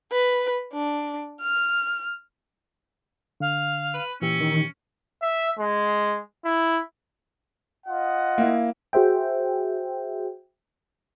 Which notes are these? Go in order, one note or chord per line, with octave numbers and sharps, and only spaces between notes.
B4
D4
F6
D3 F5
B4
A#2 E3 C#4 G4 E6
D#3
E5
G#3
E4
F4 D#5 F#5
A#3 E4
F#4 G#4 C5 E5 G5